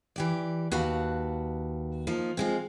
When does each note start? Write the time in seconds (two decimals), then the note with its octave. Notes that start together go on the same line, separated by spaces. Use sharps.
0.16 E3 G4 D5
0.72 D#2 F#4 B4 F5 A5
2.07 F3 A#3 D#4
2.37 F3 G#3 C4